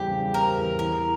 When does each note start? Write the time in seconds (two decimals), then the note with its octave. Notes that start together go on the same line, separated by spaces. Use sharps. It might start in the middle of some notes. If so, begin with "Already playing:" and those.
Already playing: E2 C#3 G3 C4 G4
0.11 C#3
0.34 C4 A#4
0.57 E2
0.79 E3 A#4